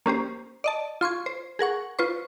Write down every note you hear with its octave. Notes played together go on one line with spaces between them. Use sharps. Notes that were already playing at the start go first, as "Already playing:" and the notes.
A#3 C#4 G4 C5
D5 D#5 A5
F4 C6 C#6 G#6
C5
G#4 A#4 F#5 C#6
F4 B4 C5 C#6